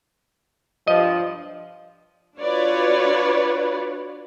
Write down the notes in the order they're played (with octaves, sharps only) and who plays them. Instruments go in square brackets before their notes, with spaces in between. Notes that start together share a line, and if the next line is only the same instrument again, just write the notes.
[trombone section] G2 F3 [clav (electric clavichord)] D#5
[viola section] D4 F4 F#4 B4 C#5 D5